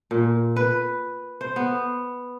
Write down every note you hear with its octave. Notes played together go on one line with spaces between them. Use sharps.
A#2
B4
C5
B3